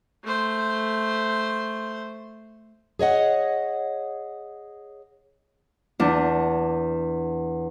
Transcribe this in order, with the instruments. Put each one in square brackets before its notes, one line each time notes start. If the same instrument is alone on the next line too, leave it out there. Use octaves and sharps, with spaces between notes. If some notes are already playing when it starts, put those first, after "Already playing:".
[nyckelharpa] A3 C5
[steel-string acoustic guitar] G#4 C#5 D#5 F#5
[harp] E2 D4